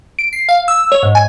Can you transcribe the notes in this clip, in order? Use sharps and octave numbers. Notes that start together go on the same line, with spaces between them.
D7
C7
F5
E6
C#5
G#2
G#5